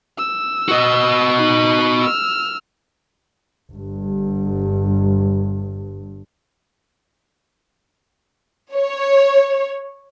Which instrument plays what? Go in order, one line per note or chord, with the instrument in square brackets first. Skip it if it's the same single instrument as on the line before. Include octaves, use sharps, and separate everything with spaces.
[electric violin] E6
[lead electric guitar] F#4 D#5
[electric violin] D#4 B5
E6 F6
[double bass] G1 G2
[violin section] C#5